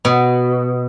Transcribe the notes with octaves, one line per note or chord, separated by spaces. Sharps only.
B2